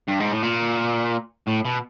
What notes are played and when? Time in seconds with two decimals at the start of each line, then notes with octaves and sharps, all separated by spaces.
0.08 G2
0.20 G#2
0.32 A2
0.43 A#2
1.48 A2
1.65 B2